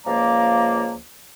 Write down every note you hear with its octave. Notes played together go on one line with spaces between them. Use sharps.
C#2 F3 A#3 D5 A#5